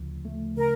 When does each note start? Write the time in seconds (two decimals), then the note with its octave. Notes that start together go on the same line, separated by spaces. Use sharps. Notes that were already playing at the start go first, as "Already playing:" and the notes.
Already playing: D2 C#3 F3
0.25 A3
0.57 C#3 A#4